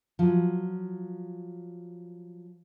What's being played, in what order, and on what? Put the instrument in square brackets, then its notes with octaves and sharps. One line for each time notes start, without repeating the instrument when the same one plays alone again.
[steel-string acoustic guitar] F3 F#3